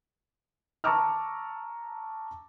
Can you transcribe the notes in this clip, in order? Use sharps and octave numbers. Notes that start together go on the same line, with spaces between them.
A5 A#5 C#6 D6 E6 F6